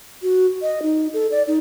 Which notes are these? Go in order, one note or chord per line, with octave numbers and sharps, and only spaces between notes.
F#4
D#5
D#4
A4
D5
D#4